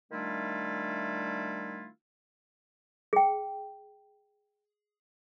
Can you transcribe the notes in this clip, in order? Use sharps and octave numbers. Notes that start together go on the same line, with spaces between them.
D#3 G3 A3 D4 E4 F4
G#4 G5